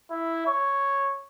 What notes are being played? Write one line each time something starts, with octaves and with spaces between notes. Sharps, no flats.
E4
C#5